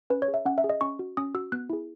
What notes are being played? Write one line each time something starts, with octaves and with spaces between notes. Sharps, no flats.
C#4 B4
C#5
G#4
E5
C#4 F#5
E5
G#4
D#5
C#4 C#6
F#4
C#4 D#6
F#4 E6
B3 F#6
E4 G#4